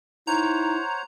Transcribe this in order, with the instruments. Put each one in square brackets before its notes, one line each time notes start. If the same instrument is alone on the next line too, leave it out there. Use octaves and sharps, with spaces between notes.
[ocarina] D#4 [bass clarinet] E4 [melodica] C5 C#5 F#5 [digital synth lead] A#5